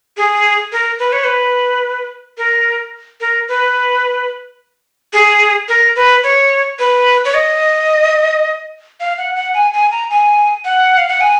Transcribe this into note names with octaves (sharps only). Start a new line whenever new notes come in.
G#4
A#4
B4
C#5
B4
A#4
A#4
B4
G#4
A#4
B4
C#5
B4
C#5
D#5
F5
F#5
F#5
G#5
G#5
A#5
G#5
F#5
F5
F#5
G#5